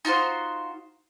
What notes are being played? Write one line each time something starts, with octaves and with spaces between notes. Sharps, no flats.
D#4 F4 F#4 C5